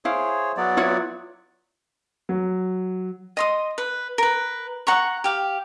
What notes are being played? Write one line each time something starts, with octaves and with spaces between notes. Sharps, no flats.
E4 G#4 C5 C#5 F5
F#3 B3 D5
E4 F4 C#5
F#3
D#5 C6 D#6
B4
A#4 B4
F#5 A#5 C#6
G4 F5